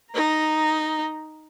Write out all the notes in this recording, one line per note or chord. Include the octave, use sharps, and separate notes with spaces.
D#4 A#5